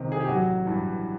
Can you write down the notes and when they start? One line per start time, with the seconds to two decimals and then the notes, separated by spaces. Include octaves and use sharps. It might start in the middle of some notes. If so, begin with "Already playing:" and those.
Already playing: C2 C3 D#3
0.12 G#4
0.20 G4
0.28 A1 F#3 F#4
0.66 G2 E3